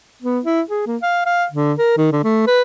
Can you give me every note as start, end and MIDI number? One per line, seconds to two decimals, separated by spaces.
0.22 0.40 59
0.45 0.61 64
0.70 0.82 68
0.86 0.97 58
1.03 1.23 77
1.26 1.45 77
1.52 1.73 50
1.78 1.92 70
1.97 2.07 51
2.12 2.20 50
2.24 2.46 57
2.47 2.62 71